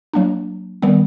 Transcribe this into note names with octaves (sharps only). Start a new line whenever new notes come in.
F#3 A#3 D4
D#3 G3 B3